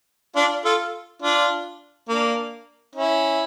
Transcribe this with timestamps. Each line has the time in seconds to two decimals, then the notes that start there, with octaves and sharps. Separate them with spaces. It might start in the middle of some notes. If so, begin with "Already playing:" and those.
0.36 D4 F4
0.65 F4 A4
1.22 D4 F4
2.09 A#3 D4
2.95 C#4 E4